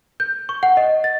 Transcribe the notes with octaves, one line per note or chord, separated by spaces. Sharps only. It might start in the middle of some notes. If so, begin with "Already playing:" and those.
G6
C#6
F#5
D#5
A6